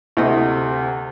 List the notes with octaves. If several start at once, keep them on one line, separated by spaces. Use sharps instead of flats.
D2 C3 E4 D#5